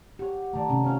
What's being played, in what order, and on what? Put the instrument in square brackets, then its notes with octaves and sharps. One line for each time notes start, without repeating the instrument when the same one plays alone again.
[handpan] G4 [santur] C#5 F#5
[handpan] D#3 A3 [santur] D5 A5 A#5
[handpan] C3 C#4 D#4
[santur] F3 C#4 [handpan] C4 C#5